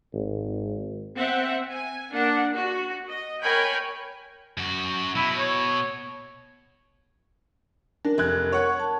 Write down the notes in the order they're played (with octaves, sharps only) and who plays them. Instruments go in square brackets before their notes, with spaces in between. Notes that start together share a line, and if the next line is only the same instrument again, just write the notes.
[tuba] G#1
[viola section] C4 E5 F#5
G#5
A#3 D4 F#5
F#4
D#5
A#4 C#5 G5 G#5 B5
[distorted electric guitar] F#2 F#4
[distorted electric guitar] B2 [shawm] E4
[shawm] C#5
[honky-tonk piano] D4 [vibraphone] A#4
[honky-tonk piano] F1 F#6 G#6
C#5 F#5
[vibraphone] A5